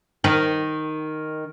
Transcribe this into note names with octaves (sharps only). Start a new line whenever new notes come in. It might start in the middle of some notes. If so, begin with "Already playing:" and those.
D#3